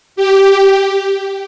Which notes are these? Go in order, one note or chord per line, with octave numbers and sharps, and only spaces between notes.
G4